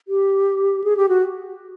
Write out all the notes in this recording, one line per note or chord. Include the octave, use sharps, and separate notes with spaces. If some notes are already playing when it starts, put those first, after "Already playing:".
G4
G#4
G4
F#4